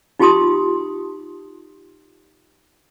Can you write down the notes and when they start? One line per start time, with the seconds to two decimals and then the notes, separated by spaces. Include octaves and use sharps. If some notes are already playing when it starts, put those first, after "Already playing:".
0.19 D#4 F4 G4 A5 C6 D#6